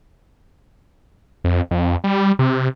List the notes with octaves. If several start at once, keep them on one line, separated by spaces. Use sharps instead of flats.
F2
F2
G3
C3